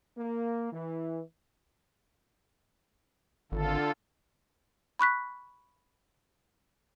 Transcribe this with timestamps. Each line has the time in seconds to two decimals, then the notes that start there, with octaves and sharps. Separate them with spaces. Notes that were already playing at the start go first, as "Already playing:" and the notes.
0.17 A#3
0.72 E3
3.52 G#1 D3 F4 A4
4.99 B5 C#6 F#6 B6